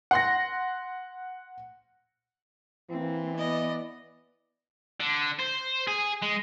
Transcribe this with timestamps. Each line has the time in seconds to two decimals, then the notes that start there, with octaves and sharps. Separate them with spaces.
0.11 F#5 C6 A#6
2.90 E3 A#3 C4
3.38 B3 D5 D#5
5.00 D3
5.40 C5
5.87 G#4
6.23 G#3